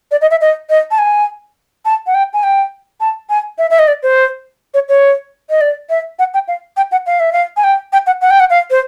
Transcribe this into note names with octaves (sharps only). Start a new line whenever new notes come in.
D5
D#5
E5
D#5
D#5
A5
G#5
A5
F#5
G5
G#5
G5
A5
G#5
E5
E5
D#5
D5
C5
C#5
C#5
D#5
D5
E5
F#5
G5
F5
G5
F#5
F5
E5
F5
G#5
G5
G5
F#5
F#5
G5
F#5
F5
C5